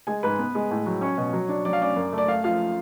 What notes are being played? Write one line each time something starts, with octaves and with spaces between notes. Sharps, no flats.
G#3 G#5
G#2 B4
B3
G#3
A2
F#3
C#4 C#5
B2
F#3
D4
F#3 D5
F5
C#4 D5
F#2
A3
D5
A3 F5
F3 F5